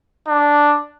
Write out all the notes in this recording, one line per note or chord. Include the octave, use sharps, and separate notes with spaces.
D4